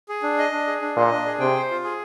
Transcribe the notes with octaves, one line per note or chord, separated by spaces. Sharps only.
G#4
D4
D#5
D4
G#4
D4
A#2 D#5
D4
G#4
C3 G5
C5
F4
G#4